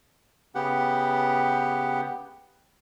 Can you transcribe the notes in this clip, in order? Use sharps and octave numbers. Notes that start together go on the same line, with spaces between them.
C#3 B3 G4 F#5